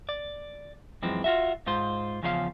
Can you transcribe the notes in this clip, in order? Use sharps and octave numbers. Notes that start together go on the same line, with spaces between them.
D5
F#2 E3 F3 G#3 C4
F4 F#4 E5
G#2 F4 C5
E2 C#3 F3 C#4 G#4 F5